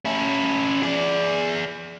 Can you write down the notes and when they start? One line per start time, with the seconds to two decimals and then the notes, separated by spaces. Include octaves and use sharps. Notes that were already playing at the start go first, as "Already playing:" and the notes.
0.05 C#4 E4
0.83 G#4 D5